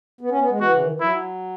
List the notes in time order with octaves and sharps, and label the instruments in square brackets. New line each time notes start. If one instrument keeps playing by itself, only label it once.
[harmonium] B3
C#4
B3
G#3
[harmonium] E3 [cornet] F#4
[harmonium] C#3
D#3
E3
[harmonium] F#3 [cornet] E4